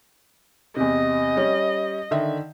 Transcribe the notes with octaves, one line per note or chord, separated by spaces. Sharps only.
E2 C3 D#5
G3 C#4
D3 D#3 E5